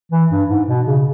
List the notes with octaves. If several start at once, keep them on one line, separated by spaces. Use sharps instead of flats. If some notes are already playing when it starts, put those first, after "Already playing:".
E3
G2
G#2
B2
C#3